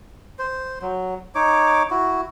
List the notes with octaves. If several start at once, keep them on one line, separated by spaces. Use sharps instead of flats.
C5
F#3
D#4 C#5 D6
E4 F#4